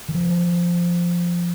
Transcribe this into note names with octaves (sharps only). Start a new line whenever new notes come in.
D#3
F3